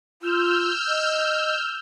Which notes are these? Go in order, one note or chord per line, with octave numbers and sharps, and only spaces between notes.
F4 E6 F6 G6
D#5